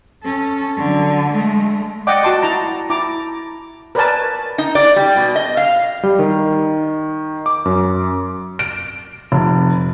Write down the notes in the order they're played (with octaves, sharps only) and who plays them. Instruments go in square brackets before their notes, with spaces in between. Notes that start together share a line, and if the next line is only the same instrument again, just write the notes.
[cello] C#4 A4
D3 F#3
G#3 A3
[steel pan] D5 D#5 F#5 G5 D6
F#4 D5 A5 C6 D6
E4 A5 A#5
E4 A5 A#5 D6
A#4 B4 C#5 D5 G#5 A5
[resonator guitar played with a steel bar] D#4
D5
G3
B2
D#5
F5
[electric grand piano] G3
D#3
D6
F#2
[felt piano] D7
F1